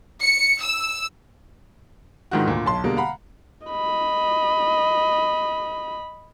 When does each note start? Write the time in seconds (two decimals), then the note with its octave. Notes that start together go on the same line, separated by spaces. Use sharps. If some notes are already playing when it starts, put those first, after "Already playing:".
0.21 C#7
0.61 E6
2.31 G#2 D3 D#3 F4 F#4
2.47 D2 A#2
2.65 B1 A5 C6
2.84 B2 D3 G3 G#3 A#3
2.97 F5 F#5 A#5 B5
3.68 D#5 B5